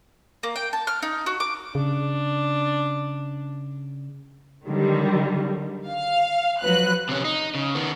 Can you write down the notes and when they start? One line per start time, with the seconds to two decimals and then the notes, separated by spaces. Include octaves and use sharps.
0.43 A#3
0.56 G5
0.73 A5
0.87 F6
1.02 D#4
1.26 F#4
1.40 D6
1.75 C#3 D4
4.66 D3 D#3 F#3 G3
5.88 F5
6.62 F3 F#3 B4 F#6
7.09 C3 C#4
7.25 D#4
7.55 C#3
7.75 D#3 B3